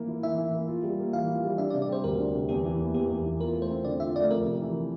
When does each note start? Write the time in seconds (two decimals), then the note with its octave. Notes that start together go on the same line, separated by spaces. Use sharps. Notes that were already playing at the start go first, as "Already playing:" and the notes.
Already playing: E3 A#3
0.08 E4
0.23 E3 E5
0.38 E3
0.53 A#3
0.68 F4
0.83 G3
0.99 A#3
1.13 E3 F5
1.29 F4
1.44 G3
1.58 D4 E5
1.70 D5
1.74 C3
1.82 D5
1.89 G3 C5
2.04 D2 A#4
2.19 D4
2.35 C3
2.49 E2 G4
2.65 E3
2.80 A#3
2.94 E2 G4
3.10 E2
3.25 E3
3.40 F4 A#4
3.54 A3
3.62 C5
3.70 C4
3.85 D3 D5
4.00 F4 E5
4.15 A3 D5
4.31 F2 A#4
4.45 C3
4.61 E3